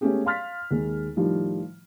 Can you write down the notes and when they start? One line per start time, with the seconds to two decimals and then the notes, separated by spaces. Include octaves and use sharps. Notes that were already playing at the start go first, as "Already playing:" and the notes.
0.01 G#3 A3 B3 C#4 G4 G#4
0.25 F5 C6 F6 A6 B6
0.71 D#2 G#3
1.16 A2 D#3 F3 G3